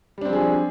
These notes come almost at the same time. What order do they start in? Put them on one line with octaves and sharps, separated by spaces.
G3 D4 C4 F3 G#4